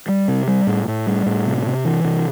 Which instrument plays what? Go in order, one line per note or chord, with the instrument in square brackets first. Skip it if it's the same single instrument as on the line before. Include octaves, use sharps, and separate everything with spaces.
[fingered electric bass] G3
C3
G3
A2
A2
G3
A2
C3
C3
E3
C3